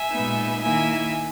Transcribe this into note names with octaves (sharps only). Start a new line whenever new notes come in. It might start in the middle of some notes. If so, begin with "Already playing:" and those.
Already playing: E5 G#5
A#2 G#3 B3 D#4
D#3 A#3 E4 E5 G#5